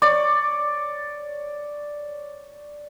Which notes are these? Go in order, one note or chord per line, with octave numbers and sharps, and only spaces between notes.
C#5 D5